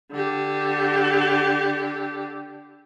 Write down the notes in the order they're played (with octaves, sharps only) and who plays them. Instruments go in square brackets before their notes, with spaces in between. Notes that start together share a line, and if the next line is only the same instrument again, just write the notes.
[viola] D3 G4